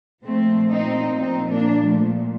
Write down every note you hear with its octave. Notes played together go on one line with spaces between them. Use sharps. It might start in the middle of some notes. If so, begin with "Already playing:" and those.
A#2 F3 A3 C4
C4 D#4
C4 D#4
A#3 D4
F3 A3